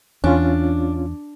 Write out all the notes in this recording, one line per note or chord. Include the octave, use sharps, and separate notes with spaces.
E2 C#4 D4 F4